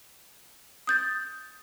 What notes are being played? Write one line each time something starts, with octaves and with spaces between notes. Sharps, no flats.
D#6 G6 A6